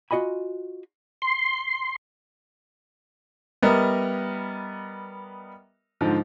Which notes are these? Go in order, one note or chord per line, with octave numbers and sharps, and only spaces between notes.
F4 F#4 D#5 G#5 B5
C6
G3 B3 A#4 D#5 E5
G#2 D3 F3